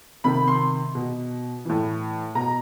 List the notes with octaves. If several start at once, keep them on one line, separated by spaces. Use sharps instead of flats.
C3 D#3 B5
C6
B2
A2 E3
B2 A#5